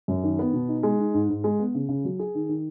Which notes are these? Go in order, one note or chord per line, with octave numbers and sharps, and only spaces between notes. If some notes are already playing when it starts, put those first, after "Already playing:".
F#2
D#3
B3
B2
D#4
G#3
D#4
G#2
G#2
G#3
B3
C#3
C#3
F#3
G#4
D#3
D#3